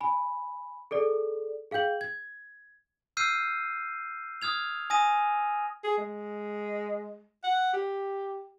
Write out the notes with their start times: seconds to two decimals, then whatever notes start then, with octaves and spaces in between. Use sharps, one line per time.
0.01 G#5 B5
0.91 G#4 A4 D5
1.71 G#4 F5 G5 G6 F#7
2.01 G#6
3.17 E6 F6 G6 C7 D#7
4.42 D#6 F6 G#6 F7
4.90 G#5 D#6 A#6 D#7
5.84 G#4
5.98 G#3
7.44 F#5
7.73 G4